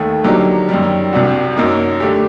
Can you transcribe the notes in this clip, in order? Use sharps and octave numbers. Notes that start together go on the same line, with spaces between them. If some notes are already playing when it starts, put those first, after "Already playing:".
Already playing: D#2 D#3 A3
D3 F#3 A#3 D#4 G4
F#2 D#3 G3
C2 C3 G3 D4 F#4
F#2 F#3 A#3 D#4
D3 A3 D4 G4